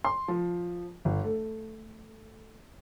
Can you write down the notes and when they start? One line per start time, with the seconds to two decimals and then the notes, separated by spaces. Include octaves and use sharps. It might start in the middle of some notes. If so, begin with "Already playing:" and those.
0.05 C6
0.28 F3
1.05 G1
1.24 A3